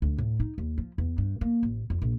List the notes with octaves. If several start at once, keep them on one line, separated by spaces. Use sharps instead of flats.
D2
A2
D#4
D#2
F3
E2
G2
A#3
A1
F2
A#1